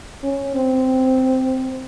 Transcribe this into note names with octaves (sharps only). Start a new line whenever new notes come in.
C#4
C4